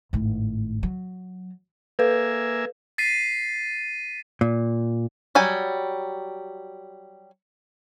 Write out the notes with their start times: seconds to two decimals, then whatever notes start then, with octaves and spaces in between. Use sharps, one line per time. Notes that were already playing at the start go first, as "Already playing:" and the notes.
0.13 G#1 A2
0.83 F#3
1.99 A#3 A4 B4 E5 F5 G#5
2.98 A6 B6 C7 D#7
4.41 A#2
5.35 F#3 G3 G#5